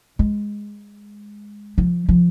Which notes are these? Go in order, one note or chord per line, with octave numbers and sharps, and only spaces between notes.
G#3
F3
F3